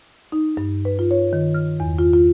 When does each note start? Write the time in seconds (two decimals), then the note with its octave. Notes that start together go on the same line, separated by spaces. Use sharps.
0.32 D#4
0.57 G2
0.85 B4
0.99 F4
1.11 C#5
1.33 D#3
1.54 F6
1.80 E2
1.99 F4
2.13 F4